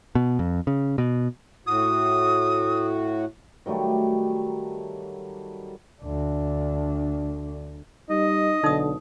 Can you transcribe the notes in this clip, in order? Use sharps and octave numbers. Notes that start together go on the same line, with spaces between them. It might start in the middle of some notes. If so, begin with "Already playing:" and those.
B2
F2
C#3
B2
A2 F#4 D#6
D#3 F#3 G3 A3
D2 D4
G3 D#4 D#5
B1 D3 D#4 D#6